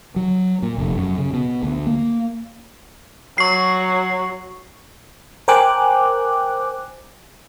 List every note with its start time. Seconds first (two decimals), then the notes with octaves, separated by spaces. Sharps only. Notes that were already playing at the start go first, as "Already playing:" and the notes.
0.16 F#3
0.62 A#2
0.78 F1
0.96 F#2
1.18 C#3
1.33 B2
1.63 D2
1.87 A#3
3.38 F#3 C#6 C7
5.48 A#4 C5 G5 G#5 D6 F#6